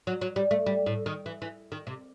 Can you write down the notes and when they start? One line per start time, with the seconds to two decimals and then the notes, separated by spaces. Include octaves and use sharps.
0.07 F#3
0.21 F#3
0.36 G3
0.51 A3
0.66 G3
0.86 A2
1.06 D#3
1.26 E3
1.42 E3
1.72 D#3
1.87 C3